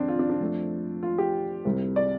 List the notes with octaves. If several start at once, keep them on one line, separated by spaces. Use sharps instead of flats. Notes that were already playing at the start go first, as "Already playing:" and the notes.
Already playing: F2 C3 C4 D4
F4
D4
D4
F2 F3 A3
F4
G4
C2 C3 G3
D5